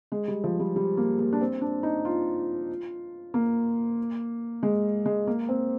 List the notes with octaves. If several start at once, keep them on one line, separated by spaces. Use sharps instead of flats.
G#3
G3
F3
G3
G3
A#3
A#3
D4
C4
D4
D#4
F4
A#3
G#3
G#3
A#3
C4